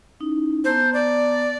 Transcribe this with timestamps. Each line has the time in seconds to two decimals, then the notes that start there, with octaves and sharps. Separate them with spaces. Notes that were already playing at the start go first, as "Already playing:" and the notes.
0.20 C#4 D#4 E4
0.65 B3 C5 A5 A#5
0.94 D5